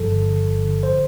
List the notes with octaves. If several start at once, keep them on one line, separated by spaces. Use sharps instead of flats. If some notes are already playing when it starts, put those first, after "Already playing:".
Already playing: G1 G2 F3 A4
D3
D3
G1
D3
C5